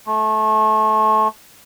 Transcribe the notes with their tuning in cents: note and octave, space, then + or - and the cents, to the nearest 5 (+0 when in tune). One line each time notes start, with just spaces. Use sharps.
A3 -25